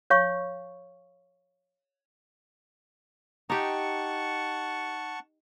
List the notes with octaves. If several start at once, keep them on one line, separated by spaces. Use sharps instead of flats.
C#5 F5 C#6
D#4 G4 F#5 A5 C#6